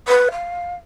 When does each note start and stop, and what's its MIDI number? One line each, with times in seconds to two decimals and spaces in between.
0.08 0.29 71
0.32 0.75 77